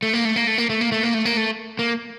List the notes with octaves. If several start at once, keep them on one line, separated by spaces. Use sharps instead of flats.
A3
A#3
A3
A#3
A3
A#3
A3
A#3
A3
A#3
A3
A#3
A3
A#3